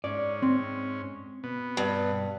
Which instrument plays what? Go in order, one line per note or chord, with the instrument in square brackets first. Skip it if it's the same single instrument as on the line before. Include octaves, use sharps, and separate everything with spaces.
[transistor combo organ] G#2 C#4 [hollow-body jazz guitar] D5
[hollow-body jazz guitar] C4
[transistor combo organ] B2 B3
[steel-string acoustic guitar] G2